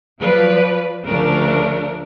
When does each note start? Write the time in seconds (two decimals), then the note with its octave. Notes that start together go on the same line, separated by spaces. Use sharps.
0.19 F3 F#3 B4 D5
1.06 D2 C#3 F3 A3 D4 A#4